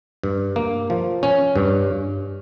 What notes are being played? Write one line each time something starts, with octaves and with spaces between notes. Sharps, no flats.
G2
A#3
F3
C#4
G2